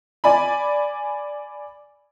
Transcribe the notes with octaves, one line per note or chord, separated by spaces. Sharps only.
D5 G#5 B5